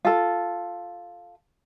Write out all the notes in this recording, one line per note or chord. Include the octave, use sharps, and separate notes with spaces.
F4 A4